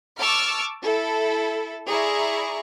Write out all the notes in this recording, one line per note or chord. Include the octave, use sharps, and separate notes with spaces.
A5 C#6 D6 E6 F6
E4 A4
E4 G#4 D5 A#5 C#6